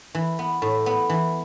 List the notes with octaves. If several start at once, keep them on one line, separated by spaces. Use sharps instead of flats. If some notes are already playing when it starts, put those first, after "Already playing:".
E3
B3
A2
B3
E3